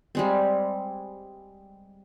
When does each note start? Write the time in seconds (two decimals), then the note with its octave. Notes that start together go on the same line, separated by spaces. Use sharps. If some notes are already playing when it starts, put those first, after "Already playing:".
0.15 G3 G#3 C4